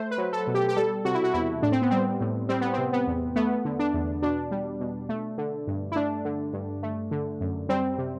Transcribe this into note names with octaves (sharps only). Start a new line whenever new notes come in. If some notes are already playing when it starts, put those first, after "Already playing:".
Already playing: A3 C5
B4
F#3
A4
B2
G4
G4
G3 A4
C3 F#4
E4
F#4
E2 E4
A2 D4
C4
B3
G3 C4
A2
G3 C4
B3
C3 C4
B3
E2
A3 B3
D3
D4
E2
B2 D4
G3
B2
A3
D3
G2
E4
A3 D4
D3
G2
A3
D3
F#2
G3 C4
C3